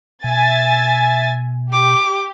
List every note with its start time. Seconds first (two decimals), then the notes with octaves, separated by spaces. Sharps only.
0.24 B2 E5 G#5 A6
1.73 G4 D6